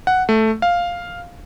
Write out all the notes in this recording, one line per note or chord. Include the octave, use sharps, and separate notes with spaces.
F#5
A3
F5